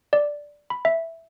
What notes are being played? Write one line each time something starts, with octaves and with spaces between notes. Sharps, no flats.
D5
B5
E5